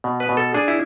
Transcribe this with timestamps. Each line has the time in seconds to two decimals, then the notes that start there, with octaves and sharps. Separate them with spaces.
0.04 B2
0.20 B4
0.29 B2
0.37 A4
0.54 D4 G#4
0.68 E4